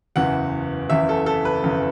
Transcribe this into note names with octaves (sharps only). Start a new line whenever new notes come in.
F#1 E2 C#3 E3 F#5
F#1 E2 C#3 E3 E5
A4
A4
B4
F#1 E2 C#3 E3